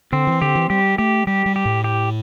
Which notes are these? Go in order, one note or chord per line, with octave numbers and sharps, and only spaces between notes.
D3 C4
E3
D3 G4
E3
G3 G4
A3 G4
G3 G4
G3
G4
A2
G4